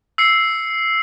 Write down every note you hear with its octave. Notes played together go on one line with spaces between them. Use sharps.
E6 C7 C#7